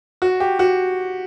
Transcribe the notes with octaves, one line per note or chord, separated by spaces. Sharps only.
F#4
G4
F#4